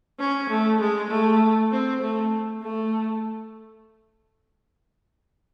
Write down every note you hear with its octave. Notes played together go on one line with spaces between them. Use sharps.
C#4
A3
G#3
A3
C4
A3
A3